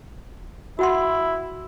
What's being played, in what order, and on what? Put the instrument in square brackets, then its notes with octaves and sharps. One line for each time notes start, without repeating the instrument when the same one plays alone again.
[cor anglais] E4 [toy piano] F#4 F#5 C6